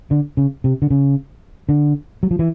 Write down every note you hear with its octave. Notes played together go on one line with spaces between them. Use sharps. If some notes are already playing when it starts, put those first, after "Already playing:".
D3
C#3
C3
D3
C#3
D3
F#3
F3
E3